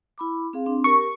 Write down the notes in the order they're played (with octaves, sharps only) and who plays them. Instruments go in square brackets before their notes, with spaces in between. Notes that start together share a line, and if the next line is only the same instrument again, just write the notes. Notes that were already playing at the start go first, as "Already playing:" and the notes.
[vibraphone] E4 B5 D6
C4 G#4 F5
C4 D4
[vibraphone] G4 A#4 [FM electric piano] C#6